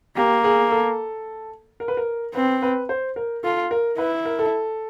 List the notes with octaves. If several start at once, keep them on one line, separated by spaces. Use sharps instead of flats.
A#3 G4
G#4
A4
A#4
B4
A#4
C4 B4
B4
C5
A#4
F4 A4
A#4
E4 B4
A#4
A4